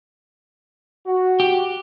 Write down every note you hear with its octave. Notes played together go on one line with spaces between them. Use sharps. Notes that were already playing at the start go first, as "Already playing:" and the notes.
F#4
G4